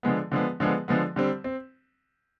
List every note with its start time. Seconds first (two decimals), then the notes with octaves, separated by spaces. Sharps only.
0.03 D3 F3 G#3 B3
0.32 D3 F3 G#3 B3
0.60 D3 F3 G#3 B3
0.88 D3 F3 G#3 B3
1.16 D3 G3 C4
1.44 C4